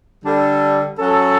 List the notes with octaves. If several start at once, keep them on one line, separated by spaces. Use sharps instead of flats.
D3 G3 D4 A4
F#3 C#4 F#4 A4